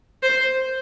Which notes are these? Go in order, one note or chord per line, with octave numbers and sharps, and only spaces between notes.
C5